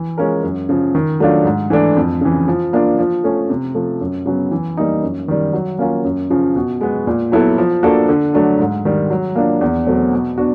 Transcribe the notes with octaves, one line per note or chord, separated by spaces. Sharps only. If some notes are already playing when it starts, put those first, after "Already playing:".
Already playing: E3
G#3 C#4 F4 A#4
F#2
C#3 F3
D#3
F#3 A3 D4 F4
G#2
E3 A3 D4
F2
C#3 E3
F3
A#3 D4 F4
F3
A3 C#4
C3
F3 A3
F#2
C#3 F#3 B3
E3
G3 A#3 D#4
F#2
D#3 G3
F#3
A#3 C#4 F4 A#4
F#2
C#3 F3
B2
G#3 B3
A#2
F#3 B3 E4 A4
F3
A#3 D4 F#4 A4
D3
F#3 A3 D4
G#2
D#3 G3
F#3
A#3 D4 F4
E2
B2 F#3 A3 C4
B2
B3 D4 F#4